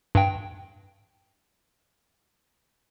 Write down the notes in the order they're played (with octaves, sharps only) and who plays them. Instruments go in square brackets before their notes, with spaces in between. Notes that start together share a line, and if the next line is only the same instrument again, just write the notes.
[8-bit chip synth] G2 G5